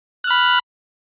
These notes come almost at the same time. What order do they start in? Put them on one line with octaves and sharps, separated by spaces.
F#6 F6 B5